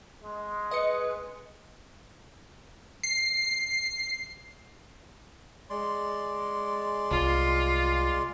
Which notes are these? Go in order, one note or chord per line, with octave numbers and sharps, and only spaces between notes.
G#3
B4 D#5 C#7
C7
G#3 D5 C6
C2 F4